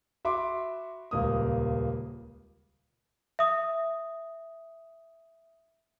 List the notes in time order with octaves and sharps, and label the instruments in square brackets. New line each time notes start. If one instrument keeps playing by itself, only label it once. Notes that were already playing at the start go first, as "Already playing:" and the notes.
[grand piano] F#4 E5 B5 C6 D6
D#1 C#2 A#3 D#6
[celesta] E5 D#6